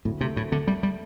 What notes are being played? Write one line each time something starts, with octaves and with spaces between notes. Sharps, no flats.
D2 A2
C3 A3
D2 A2
D3 A3
G3 A3
G3